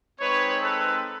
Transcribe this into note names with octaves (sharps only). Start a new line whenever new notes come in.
G#3 C4 D#4 B4 C#5
A4 B4